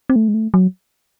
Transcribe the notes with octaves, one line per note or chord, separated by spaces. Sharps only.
C4
A3
G#3
A3
F#3